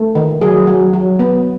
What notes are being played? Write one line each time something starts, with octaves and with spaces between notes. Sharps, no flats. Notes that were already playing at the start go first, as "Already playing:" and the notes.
Already playing: A3
D#3
F#3 G#4
F#3
F#3
B3